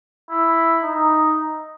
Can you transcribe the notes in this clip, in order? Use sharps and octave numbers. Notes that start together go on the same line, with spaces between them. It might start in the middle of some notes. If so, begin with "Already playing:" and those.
E4
D#4